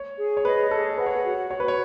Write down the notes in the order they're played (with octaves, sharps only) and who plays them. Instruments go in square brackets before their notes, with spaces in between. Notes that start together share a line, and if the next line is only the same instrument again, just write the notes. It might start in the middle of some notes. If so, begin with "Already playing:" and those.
Already playing: [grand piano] C#5
[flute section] G#4
[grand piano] C#5
[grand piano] B4 [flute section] D#5
[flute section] G#4 [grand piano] A4
[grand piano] B4 [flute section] F#5
[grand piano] C#5
B4
[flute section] F#4
[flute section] F#4 [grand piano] C#5
[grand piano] B4
C#5